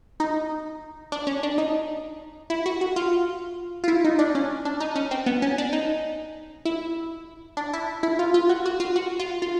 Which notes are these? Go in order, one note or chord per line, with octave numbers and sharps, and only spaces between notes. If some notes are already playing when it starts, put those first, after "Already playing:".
D#4
D4
C#4
D4
D#4
E4
F#4
F#4
F4
F4
E4
D#4
D4
C#4
D4
D#4
C#4
C4
B3
C#4
D4
D#4
E4
D4
E4
E4
F4
F4
F#4
F#4
F4
F#4
F4
F4